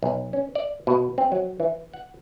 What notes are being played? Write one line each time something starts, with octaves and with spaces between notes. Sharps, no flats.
B1
C#4
D5
B2
C4
F#3
E3
F#5